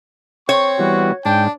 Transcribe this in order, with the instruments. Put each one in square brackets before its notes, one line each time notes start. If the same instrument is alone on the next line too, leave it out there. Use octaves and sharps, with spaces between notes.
[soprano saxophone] C4 [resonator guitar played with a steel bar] C#5 [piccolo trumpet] C#6
[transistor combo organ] E3 G3 B3 [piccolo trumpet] F#4
[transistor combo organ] G#2 [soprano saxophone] D4 [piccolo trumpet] G5